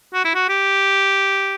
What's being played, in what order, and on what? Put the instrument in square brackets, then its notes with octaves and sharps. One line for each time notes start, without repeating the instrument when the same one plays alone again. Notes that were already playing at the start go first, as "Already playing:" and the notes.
[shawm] F#4
E4
F#4
G4